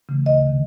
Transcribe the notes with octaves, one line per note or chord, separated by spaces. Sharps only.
C#3 E3 A3
D2 D#5
C3 D#3